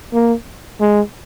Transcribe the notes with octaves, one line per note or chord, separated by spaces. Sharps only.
A#3
G#3